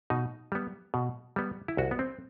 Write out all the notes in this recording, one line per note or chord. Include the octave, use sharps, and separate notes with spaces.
B2 D#4
G3 B3
B2
G3 B3
E4
C2 F#4
B3
C4